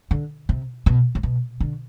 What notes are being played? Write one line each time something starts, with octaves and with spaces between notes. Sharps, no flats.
D3
C3
B2
A2
B2
D3